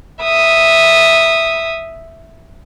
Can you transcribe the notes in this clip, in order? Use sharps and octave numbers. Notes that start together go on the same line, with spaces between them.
E5 D#6